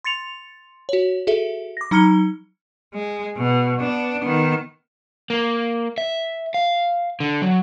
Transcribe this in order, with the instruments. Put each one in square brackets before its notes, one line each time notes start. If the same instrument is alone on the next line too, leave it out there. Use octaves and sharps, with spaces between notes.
[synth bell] C6 A6 C#7 F7
F#4 C#5
F#4 G#4 A4 E5
D6 A#6
F#3 D#4 A#5 F6 C#7 G7
[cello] G#3
B2
B3 D4
D#3 B3
[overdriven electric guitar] A#3
E5
F5
D3
F#3